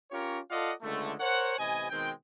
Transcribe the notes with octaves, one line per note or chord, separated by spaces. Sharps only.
C#4 F4 G4 A#4 C#5
F4 A4 D5 D#5 F5 F#5
C#2 D3 G#3 A3
A#4 C5 C#5 F#5
A1 C3 B4 D#5 G#5
B2 D#3 G#3 C4 G5